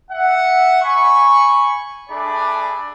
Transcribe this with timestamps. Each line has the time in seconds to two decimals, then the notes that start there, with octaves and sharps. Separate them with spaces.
0.10 E5 F#5
0.82 G#5 B5 C#6
2.10 A3 D4 G#4 D5 B5